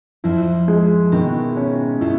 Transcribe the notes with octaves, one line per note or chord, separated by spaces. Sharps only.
F2 F3 E4
G#3
B2 D#3
C#4
B2 E4